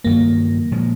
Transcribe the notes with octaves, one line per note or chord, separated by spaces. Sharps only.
G2 D#3 F#3 A#3
A#2 F3 G#3